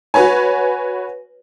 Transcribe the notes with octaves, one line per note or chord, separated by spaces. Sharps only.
F#4 B4 C#5 G#5